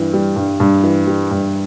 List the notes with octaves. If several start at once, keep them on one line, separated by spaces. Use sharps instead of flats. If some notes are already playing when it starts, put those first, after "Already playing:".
Already playing: G2 E3
G3
G2
G2
E3
G3
G2